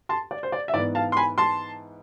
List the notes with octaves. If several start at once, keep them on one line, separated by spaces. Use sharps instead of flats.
A5 C6
D5
C5
D5
E5
G#2 E3 B3 D5
F5 A5
C6
G#5 B5
A5 C6